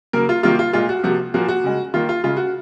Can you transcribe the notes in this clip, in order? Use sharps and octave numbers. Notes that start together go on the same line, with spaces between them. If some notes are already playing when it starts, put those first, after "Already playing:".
C#3 F#3 A#3 A#4
F4
C3 D#3 F#3 A#3 F4
F4
A#2 G#3 F4
F#4
C3 F3 A#3 F#4
A#2 F3 A#3 F#4
F#4
C#3 G#3
D#3 A#3 F4
F4
C#3 G#3 F4
F#4